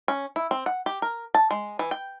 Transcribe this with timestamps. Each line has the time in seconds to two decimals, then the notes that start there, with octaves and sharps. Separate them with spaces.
0.08 C#4
0.36 E4
0.51 C4
0.66 F#5
0.86 G4
1.02 A#4
1.34 A5
1.51 G#3
1.79 E3
1.91 G5